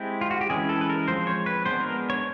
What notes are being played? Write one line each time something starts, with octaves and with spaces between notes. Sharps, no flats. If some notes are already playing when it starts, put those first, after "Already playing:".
Already playing: G#3 C4 E4 G4
F4
F#4
G4
E3 G#3 C#4 E4 G#4
A4
B4
A#4
F3 G#3 C4 C5
C#5
B4
G#3 B3 D4 C5
A#4
C#5